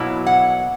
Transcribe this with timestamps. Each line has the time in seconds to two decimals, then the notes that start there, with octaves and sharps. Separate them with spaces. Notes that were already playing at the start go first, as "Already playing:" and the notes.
Already playing: B2 F#3 A#3 E4
0.26 F#5